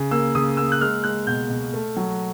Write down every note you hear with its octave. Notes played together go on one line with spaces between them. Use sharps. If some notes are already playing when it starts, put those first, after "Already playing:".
Already playing: C#3
A#3 E6
C#3 D#6
A#3 E6
F#6
G#3 F6
G#3 F#6
B2 G6
B2
A3
F#3